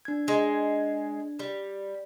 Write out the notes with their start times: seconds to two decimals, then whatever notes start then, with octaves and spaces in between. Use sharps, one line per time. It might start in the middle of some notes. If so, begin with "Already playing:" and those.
0.05 D4 G#6
0.28 G#3
1.39 G3